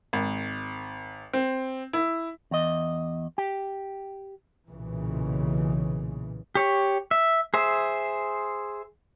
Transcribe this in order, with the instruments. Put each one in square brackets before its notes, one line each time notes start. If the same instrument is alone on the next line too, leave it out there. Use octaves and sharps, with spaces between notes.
[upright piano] G#1
C4
E4
[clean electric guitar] E2 D#5
G4
[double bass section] B1 A#2 C#3 E3
[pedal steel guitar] G4 C#5
E5
G#4 C5 E5